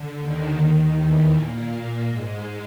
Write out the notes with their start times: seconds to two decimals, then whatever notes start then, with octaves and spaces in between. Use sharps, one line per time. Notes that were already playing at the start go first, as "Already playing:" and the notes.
Already playing: D3
0.19 D#2 D#3
0.94 E2 E3
1.32 A#2 A#3
2.08 G#2 G#3